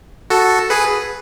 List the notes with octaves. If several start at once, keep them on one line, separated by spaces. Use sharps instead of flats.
F#4 A4
G#4 B4